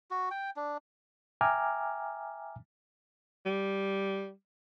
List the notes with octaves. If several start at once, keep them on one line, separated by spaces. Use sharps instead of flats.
F#4
G5
D4
E5 G5 G#5 A#5 D6 F6
G3